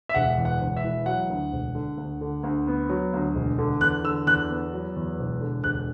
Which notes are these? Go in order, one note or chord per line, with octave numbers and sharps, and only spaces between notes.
E5
E1 F#5
E2
F#5
E1
E5
E3
F#3 F#5
D2
E1
D3
D2
D3
D2
B3
F#3
D2
E1
D3
E2 F#6
D3 E6
E2 F#6
B3
F#3
E2
E1
D3
E1 F#6